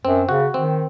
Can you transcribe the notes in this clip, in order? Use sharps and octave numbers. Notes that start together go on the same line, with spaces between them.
F#2 C4
C#3 F#4
D#3 C4